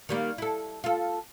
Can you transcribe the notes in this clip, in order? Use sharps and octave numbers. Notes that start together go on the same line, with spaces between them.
D#3 G3 A#3
E4 A4
F4 A4